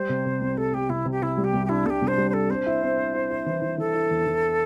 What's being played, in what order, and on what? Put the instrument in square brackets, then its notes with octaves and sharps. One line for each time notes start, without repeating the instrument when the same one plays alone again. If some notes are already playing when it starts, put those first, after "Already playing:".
Already playing: [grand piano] G3 [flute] C5
[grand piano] C3
C3
C2
[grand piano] G3 [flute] A4
[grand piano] G3 [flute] G4
[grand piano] C2 [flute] E4
[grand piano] C3
[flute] G4
[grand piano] C3 [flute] E4
[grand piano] G3
[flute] G4
[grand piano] C2
[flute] G4
[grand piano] D4 [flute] E4
[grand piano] C2 [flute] G4 A4
[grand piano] C2
[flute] C5
[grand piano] G3
[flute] C5
[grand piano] D4 [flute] A4
[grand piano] C4 [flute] C5
[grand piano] E4
C4
C4
E4
E4
E3
E3
[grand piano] E3 [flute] A4
[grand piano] E4
E2
E3